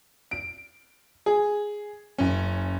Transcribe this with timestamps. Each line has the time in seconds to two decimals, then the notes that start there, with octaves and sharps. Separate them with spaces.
0.31 D7
1.26 G#4
2.18 F#1 C#4